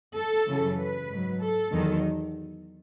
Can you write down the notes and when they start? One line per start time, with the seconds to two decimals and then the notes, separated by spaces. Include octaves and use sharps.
0.15 A4
0.46 F#2 C#3 E3
0.77 B4
1.10 G#2 F#3
1.41 A4
1.73 E2 D#3 F#3